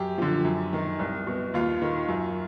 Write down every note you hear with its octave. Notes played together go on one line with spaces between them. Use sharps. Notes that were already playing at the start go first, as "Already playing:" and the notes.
Already playing: F#2 G4
D3 F3
F#2
D#3
C2
B2
D#2 F4
D#3
F#2